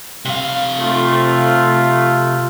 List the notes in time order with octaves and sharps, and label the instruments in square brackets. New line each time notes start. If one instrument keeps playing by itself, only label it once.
[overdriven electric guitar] C3 F5
[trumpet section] A3 F4